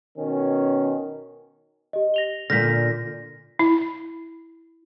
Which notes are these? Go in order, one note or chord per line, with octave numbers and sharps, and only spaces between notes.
B2 D#3 C#4
G4 D#5
A#6 F7 G7
A#2 D3 F6 G6 A#6 B6
E4